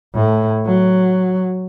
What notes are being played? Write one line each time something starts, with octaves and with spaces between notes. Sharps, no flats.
A2
F#3